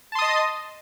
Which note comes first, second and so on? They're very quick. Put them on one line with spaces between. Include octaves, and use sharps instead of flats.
A5 C6 D#6 D#5